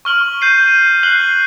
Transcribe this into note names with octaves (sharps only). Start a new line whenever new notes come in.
C#6 F6 F#7
G6 C7 D#7
D#7
F#6 C7 F#7 G7